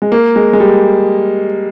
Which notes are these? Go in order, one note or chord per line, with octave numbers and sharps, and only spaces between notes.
G#3
A#3
G#3
G#3
G3